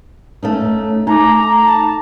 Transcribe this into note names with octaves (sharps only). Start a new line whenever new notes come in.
A3 C#4 D#4
A3 D#4 A#5 D6
A5